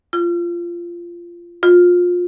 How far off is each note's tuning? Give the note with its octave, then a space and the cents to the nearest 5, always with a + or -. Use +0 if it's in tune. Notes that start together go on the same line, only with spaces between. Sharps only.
F4 -15
F4 +25